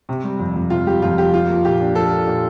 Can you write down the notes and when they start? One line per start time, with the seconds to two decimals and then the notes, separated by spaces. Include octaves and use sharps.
0.09 C3
0.24 G3
0.40 F2
0.56 F2
0.70 C3 F4
0.86 G3 G4
1.02 F2 F4
1.18 F2 G4
1.33 F3 F4
1.49 A#3
1.65 A#2 G4
1.81 D4
1.95 F3 A4
2.11 A#3
2.28 A#2